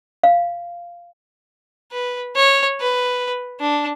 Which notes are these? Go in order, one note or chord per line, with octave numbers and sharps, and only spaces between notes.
F5
B4
C#5
B4
D4